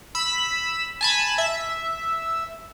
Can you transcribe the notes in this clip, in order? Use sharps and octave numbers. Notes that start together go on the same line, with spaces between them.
B5 E6 B6
G#5 A5 B5
E5